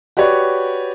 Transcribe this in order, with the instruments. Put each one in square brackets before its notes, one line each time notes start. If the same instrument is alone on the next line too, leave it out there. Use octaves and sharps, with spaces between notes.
[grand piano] F#4 G4 B4 C#5 D5